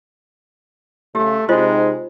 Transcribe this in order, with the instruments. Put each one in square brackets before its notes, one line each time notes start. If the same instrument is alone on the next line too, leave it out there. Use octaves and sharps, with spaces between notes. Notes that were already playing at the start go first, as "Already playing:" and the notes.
[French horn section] C#3 [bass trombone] A3 [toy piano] G4
[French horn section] C3 D#4 [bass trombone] G#3 [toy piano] F4 C5 D#5